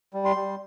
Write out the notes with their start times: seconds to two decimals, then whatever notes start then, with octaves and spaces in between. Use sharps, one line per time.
0.13 G3
0.25 C6
0.36 G3